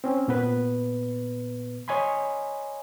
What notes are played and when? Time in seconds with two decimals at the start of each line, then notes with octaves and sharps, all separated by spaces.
0.04 C4 C#4
0.28 A#2 B3 B4
1.88 C#5 D#5 G#5 B5 C6